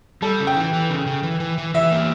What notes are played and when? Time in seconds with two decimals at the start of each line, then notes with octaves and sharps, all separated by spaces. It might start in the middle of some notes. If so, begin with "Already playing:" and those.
0.22 G3 A4
0.40 C#3
0.47 G5
0.56 E3
0.73 E3
0.90 C#3
1.07 C#3
1.23 E3
1.40 E3
1.58 E3
1.74 E3 E5
1.91 A#3